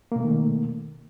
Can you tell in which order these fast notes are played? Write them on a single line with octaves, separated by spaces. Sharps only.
A#3 B2 A3 D#3